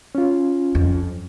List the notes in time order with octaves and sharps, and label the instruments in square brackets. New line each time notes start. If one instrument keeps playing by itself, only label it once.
[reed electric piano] C#4 F4
[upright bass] F2